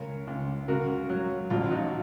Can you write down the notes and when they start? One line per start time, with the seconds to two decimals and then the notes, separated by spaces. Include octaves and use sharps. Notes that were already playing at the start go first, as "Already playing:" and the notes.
Already playing: C#2 A#4 C#5
0.27 C#2
0.68 C#3 F#4 A#4
1.09 F#3
1.50 A1 F4
1.71 D#4 F#4